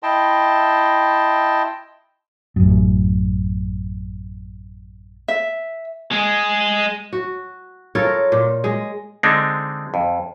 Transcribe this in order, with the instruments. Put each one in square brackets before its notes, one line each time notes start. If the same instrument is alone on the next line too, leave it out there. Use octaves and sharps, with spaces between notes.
[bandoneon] E4 D#5 G5 A5 C6
[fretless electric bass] A1 F#2
[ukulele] E5
[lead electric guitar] G#3 G#4
[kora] F#4
F4 A4 A#4 C#5
A#2
G#3
[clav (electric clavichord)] D3 G#3 C4 D4 D#4
F2